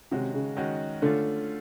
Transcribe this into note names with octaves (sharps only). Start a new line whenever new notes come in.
C3 D#3 G#3 C#4 F#4
C#3
D#3 G#3 C#4 F#4
D3 A3 C#4 F4